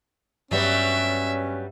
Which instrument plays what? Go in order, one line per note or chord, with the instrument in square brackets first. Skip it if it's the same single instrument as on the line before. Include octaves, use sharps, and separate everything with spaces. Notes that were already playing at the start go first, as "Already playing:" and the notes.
[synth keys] G2 [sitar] F#3 G3 B3 [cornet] C#4 [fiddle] E5